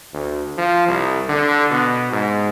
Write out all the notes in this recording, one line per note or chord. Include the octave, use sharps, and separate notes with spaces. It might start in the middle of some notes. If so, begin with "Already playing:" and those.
D2
F3
C2
D3
B2
G#2